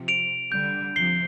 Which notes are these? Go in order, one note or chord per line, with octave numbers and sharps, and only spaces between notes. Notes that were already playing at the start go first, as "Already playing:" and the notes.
Already playing: C3 F3
D7 F7
D3 G3 G6
C3 F3 C7 G7